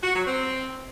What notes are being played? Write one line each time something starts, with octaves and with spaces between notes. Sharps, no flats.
F#4
F#3
C4